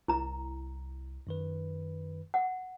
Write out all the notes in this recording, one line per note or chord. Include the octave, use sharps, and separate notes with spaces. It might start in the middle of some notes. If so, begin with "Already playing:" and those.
C2 E4 A#5
F#2 D#3 B4
F#5